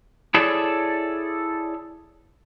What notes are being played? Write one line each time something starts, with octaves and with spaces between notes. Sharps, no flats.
E4 G#4 A4 C#5 D5